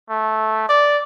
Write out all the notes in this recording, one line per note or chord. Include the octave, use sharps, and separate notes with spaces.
A3
D5